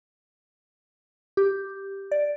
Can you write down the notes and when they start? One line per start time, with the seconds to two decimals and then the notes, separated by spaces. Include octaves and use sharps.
1.37 G4
2.11 D5